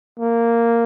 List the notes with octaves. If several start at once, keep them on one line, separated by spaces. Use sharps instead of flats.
A#3